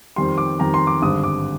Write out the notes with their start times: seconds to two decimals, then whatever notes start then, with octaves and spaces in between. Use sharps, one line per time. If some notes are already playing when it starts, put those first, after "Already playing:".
0.16 F2 D#3 G3 C6
0.38 D6
0.59 F2 D#3 G3 A#5
0.74 C6
0.87 D6
1.02 G#1 G2 D3 D#6
1.24 D6